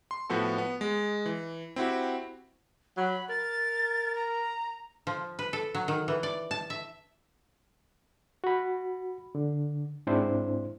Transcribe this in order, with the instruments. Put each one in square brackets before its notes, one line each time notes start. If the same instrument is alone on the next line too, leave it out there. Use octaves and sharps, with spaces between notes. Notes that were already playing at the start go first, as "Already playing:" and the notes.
[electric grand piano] C6
A2 F3 B3 F#4 A4
B3
G#3
E3
C4 E4 F#4 G4
[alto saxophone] F#3 [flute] B5
[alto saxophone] A#4 [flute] A6
[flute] A#5
[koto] F3
B4
A4
F#3
D#3
E3
D5
A5
E5
[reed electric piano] F#4 B5
D3
G#2 C4 D4 E4 C5